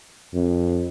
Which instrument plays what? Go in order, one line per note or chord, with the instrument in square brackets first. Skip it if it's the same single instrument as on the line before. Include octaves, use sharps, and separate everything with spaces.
[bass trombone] F2